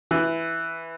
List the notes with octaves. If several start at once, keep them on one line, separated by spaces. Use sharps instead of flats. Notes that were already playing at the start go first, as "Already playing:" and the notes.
E3